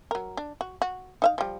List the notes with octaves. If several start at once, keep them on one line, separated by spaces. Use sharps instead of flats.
F#3 A#4
D4
F#4
F#4
D#4 E5 F5
F3 G3